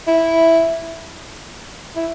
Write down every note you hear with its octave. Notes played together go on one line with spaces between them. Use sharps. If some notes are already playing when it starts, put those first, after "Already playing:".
E4
E4